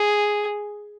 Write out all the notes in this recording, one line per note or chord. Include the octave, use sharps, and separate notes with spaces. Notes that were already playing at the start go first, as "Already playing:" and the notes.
Already playing: G#4